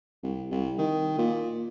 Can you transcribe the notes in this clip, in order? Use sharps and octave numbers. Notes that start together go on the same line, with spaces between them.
C2
C2
D#3
A#2